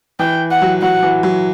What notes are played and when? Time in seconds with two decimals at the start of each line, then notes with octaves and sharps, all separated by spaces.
0.19 E3 G5
0.51 F#5
0.62 F#3
0.82 F#3 F#5
1.03 E3
1.23 F#3